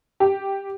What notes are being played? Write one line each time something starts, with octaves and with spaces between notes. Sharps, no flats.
G4